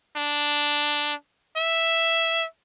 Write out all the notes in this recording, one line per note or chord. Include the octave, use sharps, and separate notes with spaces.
D4
E5